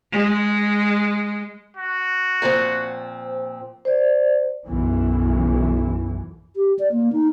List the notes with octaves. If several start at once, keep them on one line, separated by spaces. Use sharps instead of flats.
G#3
F#4
A#2 F3 C4
C5 D5
B1 F#2 E3
G4
D5
A#3
D#4